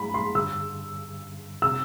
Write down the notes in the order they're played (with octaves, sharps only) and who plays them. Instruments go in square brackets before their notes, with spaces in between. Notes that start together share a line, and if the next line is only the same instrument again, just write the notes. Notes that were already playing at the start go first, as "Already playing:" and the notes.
Already playing: [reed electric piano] G2 F#3 A3 E4 [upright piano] B5
[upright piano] C6
[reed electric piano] G2 D3 G3 [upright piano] E6
[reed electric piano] C3 G3 C4 [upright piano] E6